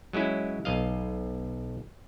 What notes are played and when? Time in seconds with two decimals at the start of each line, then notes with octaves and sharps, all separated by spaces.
0.13 F#3 G#3 C#4 E4
0.65 B1 D#5 F5